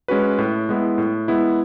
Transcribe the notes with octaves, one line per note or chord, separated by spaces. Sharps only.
G#3 C#4 F#4 B4
A2
G#3 B3 E4
A2
G#3 B3 E4